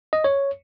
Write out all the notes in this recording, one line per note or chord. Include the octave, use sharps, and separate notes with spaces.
D#5
C#5